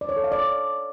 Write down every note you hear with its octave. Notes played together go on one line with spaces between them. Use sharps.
D5
C#5
A4
F5
D5